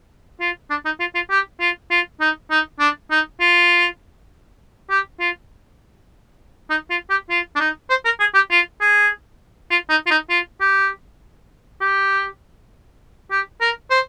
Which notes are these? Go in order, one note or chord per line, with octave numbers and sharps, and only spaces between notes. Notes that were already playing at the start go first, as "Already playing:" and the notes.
F4
D4
D#4
F4
F4
G4
F4
F4
D#4
D#4
D4
D#4
F4
G4
F4
D#4
F4
G4
F4
D4
D#4
C5
A#4
G#4
G4
F4
G#4
F4
D#4
F4
D#4
F4
G4
G4
G4
A#4
C5